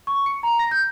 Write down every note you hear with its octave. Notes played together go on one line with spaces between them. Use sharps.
C#6
C#7
A#5
A#6
G6